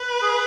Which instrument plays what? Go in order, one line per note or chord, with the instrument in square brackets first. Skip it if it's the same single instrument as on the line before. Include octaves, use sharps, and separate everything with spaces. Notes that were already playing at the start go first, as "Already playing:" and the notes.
Already playing: [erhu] B4
[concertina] G#4